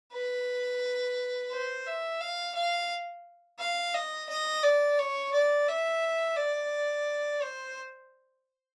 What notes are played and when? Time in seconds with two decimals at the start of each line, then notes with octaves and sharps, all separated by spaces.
0.13 B4
1.51 C5
1.86 E5
2.21 F5
2.55 F5
3.60 F5
3.94 D#5
4.30 D#5
4.63 D5
4.99 C#5
5.34 D5
5.68 E5
6.37 D5
7.42 C5